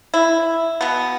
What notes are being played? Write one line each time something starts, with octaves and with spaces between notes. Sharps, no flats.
E4
B2 B3